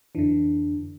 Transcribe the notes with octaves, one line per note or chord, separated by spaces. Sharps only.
F2 D3 E3 D4